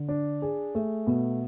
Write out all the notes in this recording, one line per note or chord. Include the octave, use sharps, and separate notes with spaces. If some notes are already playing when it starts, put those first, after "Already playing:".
Already playing: D3
D4
G#4
A3
B2